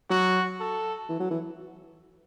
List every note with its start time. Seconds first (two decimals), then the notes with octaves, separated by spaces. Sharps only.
0.10 F#3 F#4
0.60 A4
1.09 E3
1.20 F#3
1.30 E3